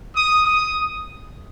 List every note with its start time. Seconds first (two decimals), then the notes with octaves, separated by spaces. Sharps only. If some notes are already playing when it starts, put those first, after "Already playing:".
0.15 D#6
0.45 D#6